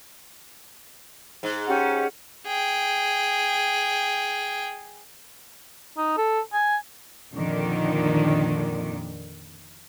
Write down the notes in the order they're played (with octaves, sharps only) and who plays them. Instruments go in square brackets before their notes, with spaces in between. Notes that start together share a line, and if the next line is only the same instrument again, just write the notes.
[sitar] G#2
[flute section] C#4 G4 F#5
[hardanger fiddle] G#4 G5
[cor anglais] D#4
A4
G#5
[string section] F2 A#2 D3 D#3